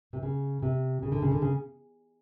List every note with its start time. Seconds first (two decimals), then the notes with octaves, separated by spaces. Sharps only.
0.13 C3
0.23 C#3
0.62 C3
1.02 C#3
1.12 D3
1.22 C#3
1.31 D3
1.42 C#3